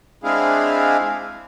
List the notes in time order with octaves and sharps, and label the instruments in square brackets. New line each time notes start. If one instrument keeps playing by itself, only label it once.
[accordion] G#3 C4 D4 E4 G#4 F5